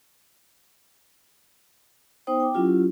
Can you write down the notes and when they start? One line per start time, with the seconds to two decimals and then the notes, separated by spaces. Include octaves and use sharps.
2.27 B3 D#4 C5 G5 D#6
2.40 G5 D6
2.54 F#3 C#4 E4 F4 G4